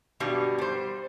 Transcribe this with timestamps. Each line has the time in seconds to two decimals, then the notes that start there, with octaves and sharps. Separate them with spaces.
0.20 G2 B2 G3
0.59 G3 C5